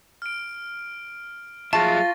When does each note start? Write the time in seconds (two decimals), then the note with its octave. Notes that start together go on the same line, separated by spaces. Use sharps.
0.22 F6 D7
1.73 F#3 F4 G#4 E5 A5 C#6 A6 A#6